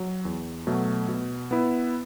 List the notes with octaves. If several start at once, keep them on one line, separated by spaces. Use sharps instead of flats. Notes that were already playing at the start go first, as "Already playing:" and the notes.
Already playing: F#3
E2
B2 F#3 A3
B2
B3 E4 B4